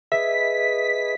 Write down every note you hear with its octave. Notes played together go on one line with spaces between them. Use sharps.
G#4 B4 D#5 E5 B6